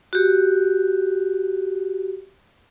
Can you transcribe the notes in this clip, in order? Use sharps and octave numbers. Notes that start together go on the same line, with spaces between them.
F#4 G4